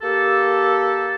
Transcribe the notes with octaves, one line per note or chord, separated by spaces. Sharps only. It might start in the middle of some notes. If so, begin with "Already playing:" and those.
A#3 G4 A4